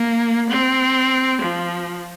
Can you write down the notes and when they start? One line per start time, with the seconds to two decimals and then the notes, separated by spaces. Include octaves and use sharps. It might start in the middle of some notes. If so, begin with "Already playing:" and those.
Already playing: A#3
0.49 C4
1.41 F3